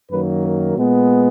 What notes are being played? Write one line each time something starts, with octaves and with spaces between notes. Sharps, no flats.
F#2 D#3 F#3 A#3 B4
A#4
A#2 G#3 B3